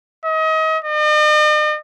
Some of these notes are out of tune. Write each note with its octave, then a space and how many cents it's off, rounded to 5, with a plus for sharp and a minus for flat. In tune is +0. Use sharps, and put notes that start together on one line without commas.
D#5 +35
D#5 -45